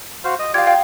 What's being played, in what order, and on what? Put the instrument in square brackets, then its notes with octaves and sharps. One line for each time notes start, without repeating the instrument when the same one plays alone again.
[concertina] F#4 C5 F5
D#5
[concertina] F4 G4 D5 [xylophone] F5 G#6
[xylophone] F5 G5